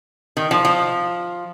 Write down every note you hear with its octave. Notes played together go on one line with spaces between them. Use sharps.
D#3
F3
F3